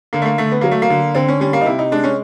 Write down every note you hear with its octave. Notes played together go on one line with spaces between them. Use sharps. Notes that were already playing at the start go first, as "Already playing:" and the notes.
D3 A#3
A3
A#3
D3 A3
B3
F#3 A#3
A3
A#3
D3
D3 C4
C#4
G3 C#4
A#3
D#4
C3 E4
D#4
G#3 D4
C#4